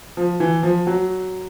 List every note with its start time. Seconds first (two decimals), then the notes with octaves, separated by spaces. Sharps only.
0.17 F3
0.40 E3
0.63 F3
0.87 F#3